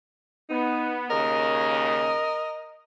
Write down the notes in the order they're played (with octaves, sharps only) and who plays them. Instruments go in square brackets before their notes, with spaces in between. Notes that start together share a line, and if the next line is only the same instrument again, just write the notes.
[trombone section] B3 [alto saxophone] D#4
[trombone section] D#2 C#3 [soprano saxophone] A#4 [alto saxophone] D#5